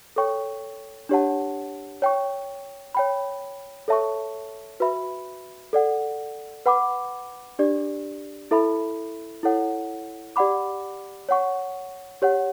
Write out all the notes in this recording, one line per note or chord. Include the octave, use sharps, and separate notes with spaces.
A4 C#5 G5 C#6
D4 G4 C#5 F#5 A5
C#5 G5 C#6
C#5 G5 B5
A4 C#5 E5 A5 C#6
F#4 B4 E5 B5
A4 D5 F#5
B4 F#5 B5 D6
D4 G4 D5
E4 A4 E5 B5
E4 A4 C#5 F#5
G4 D5 F#5 B5 D6
C#5 F#5 C#6
G4 C#5 F#5